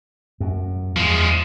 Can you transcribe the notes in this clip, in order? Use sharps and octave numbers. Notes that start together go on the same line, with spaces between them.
F#2
E2 F3 G#3